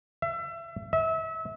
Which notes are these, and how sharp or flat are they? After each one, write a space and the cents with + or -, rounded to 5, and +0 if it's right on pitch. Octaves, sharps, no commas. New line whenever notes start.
E5 +30
E5 -30